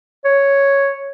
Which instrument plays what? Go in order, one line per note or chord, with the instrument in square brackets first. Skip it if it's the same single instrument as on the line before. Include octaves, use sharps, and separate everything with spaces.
[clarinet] C#5